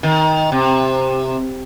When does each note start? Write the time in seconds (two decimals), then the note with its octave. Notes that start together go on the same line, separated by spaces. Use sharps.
0.03 D#3
0.52 C3